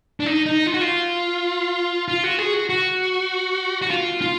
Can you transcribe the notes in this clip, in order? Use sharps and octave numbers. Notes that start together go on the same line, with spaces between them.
D4
D#4
D#4
F4
F#4
F4
F4
F#4
G#4
F#4
F#4
F#4
F4
F4